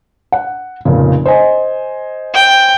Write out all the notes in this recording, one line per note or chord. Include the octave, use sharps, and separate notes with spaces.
F#5
F1 A#2 C#3
C5 D#5 G#5
G5